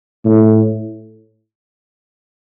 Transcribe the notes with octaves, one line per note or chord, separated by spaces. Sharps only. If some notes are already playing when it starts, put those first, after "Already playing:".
A2